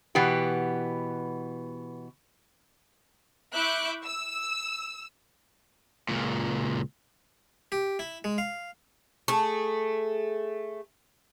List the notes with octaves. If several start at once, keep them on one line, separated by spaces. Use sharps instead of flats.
B2 E3 B3 G4
E4 E5 C#6 D6 F#6 G6
E6
C#2 A#2
G4
E4
G#3
F5
A3 G#4